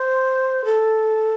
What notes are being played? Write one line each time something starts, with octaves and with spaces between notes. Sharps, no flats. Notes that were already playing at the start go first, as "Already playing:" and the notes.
Already playing: C5
A4